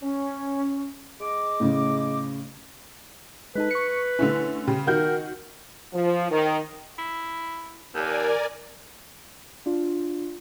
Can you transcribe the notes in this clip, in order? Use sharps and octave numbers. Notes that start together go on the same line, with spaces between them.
C#4
G#3 D#5 D6
A2 C#3
G#3 D#4 A4 B4
C#6 C#7
D3 A3 C#4 E4
C#3 G5
D#3 F#4 A#4 G6
F3
D#3
E4
D#2 A#4 D5 G#5
D4 F4